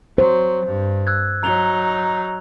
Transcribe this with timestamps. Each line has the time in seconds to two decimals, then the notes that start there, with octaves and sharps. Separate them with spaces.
0.18 F#3 C5
0.65 G2
1.07 E6 F#6 G#6
1.43 F#3 D#4 A#5 F7 G7